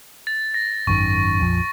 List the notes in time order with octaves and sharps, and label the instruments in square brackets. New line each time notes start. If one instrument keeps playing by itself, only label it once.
[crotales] A6
A#6
[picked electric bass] G#1 F#2 D#3 [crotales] C#6
[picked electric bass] A#1 F2 F3